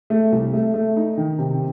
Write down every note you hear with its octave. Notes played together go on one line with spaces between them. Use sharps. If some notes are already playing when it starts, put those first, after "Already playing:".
A3
C2
A3
A3
D#4
D#3
C3